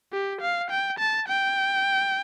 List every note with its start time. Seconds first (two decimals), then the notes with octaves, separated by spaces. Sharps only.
0.13 G4
0.41 F5
0.70 G5
0.99 A5
1.28 G5